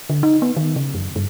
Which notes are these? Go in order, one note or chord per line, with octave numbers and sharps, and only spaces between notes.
D3
D#4
B3
D#3
C#3
F#2
G2